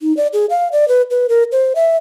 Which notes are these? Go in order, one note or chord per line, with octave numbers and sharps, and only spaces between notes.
D#4
D5
G#4
F5
D5
B4
B4
A#4
C5
E5